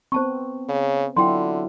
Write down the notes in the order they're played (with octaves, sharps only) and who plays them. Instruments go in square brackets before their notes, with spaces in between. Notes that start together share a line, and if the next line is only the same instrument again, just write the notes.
[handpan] B3 C4 [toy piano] C5 A5 C#6
[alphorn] C#3
[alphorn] D3 [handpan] F#3 E4 F4 [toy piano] G5 C6